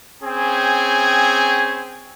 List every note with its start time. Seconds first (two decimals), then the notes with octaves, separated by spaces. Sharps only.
0.23 C4 C#4 G#4 G5 G#5